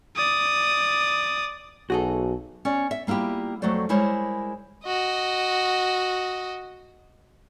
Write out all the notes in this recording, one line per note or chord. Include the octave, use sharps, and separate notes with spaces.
D5 D#6
B1 F#4 G#4 A4
C#4 D5
E5
G3 A#3 E4 F4 G4
F2 F#3 A3 F#4 C5 D5
G3 G#3 E4 A#4 C5 C#5
F#4 D#5